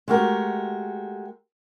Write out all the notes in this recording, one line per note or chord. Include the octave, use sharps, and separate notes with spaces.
G#3 A3 F#4 G4 A#4